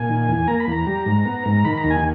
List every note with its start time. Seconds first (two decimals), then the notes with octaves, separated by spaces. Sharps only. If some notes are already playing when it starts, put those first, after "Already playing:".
Already playing: A#2 G#5
0.09 D#3
0.28 E2
0.48 A#3 A#5
0.60 B5
0.67 E2 A#5
0.87 G3
1.06 G#2
1.25 B3
1.45 G#2
1.65 D#3 B5
1.77 A#5
1.84 D#2
1.91 G#5